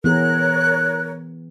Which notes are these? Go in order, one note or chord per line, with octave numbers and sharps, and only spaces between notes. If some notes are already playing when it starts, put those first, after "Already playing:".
E3 B3 G#4 A#4 C#5 F#6